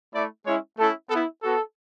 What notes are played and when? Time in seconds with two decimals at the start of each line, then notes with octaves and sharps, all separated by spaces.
0.13 A3 E4 D5
0.45 G#3 C#4 E4 C#5
0.77 A3 C#4 E4 A4
1.09 B3 A4
1.14 E4
1.42 B3 F#4 A4